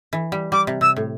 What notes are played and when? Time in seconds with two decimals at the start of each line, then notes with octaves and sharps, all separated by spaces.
0.13 E3
0.32 G3
0.52 G3 D6
0.67 C3
0.81 C3 E6
0.96 A2